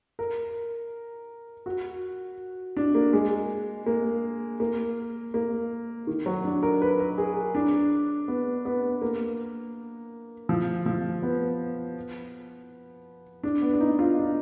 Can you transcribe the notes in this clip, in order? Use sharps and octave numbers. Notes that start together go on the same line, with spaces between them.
A#4
F#4
D4
A#3
G#3
A#3
A#3
A#3
D#3
F#3
D4
A#4
B4
A#4
G#4
D4
B3
B3
A#3
F3
F3
B3
D4
B3
D4
D#4
F4
D4